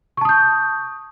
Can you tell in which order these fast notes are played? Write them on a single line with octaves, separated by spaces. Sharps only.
C#6 A5 D#6 G6